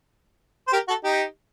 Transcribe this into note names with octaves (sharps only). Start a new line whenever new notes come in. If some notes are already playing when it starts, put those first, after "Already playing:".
C5
G4 A#4
F#4 A4
D#4 G4